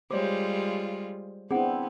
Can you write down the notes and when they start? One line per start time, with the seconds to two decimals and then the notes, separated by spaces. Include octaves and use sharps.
0.11 G3 G#3 F4 C5 C#5 D6
1.51 B3 C4 D4 E4 G#4 F#5